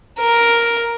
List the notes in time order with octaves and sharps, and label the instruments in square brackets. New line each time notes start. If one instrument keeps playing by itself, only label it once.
[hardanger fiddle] A#4